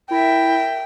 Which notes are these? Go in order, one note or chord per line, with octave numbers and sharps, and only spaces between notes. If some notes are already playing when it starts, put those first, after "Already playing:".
E4 A#4 E5 G5